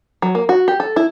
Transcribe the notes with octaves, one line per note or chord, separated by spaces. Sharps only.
F#3
A#3
F#4
G4
A4
E4